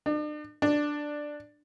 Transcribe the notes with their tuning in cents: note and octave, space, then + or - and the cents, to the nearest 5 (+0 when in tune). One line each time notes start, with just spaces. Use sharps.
D4 +40
D4 +5